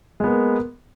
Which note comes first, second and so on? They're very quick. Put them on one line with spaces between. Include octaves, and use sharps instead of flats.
G#3 B3 A#3